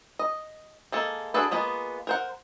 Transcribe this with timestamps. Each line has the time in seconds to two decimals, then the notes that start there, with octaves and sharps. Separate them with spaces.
0.19 D#5
0.92 G#3 A#3 A4
1.34 D4 F#4 G#4 A4 B4
1.51 G#3 A#3 B3 F4
2.07 A#4 C5 F#5